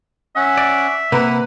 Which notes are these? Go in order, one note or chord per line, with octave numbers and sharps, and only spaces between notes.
C#4 E5 F#5
D5
C3 A#3 B4 F#5